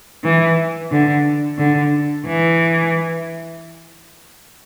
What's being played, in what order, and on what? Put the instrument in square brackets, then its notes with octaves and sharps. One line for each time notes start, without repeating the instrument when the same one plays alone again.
[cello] E3
D3
D3
E3